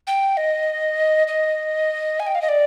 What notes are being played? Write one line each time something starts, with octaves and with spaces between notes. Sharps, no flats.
G5
D#5
D#5
G#5
G5
F5
D#5
D5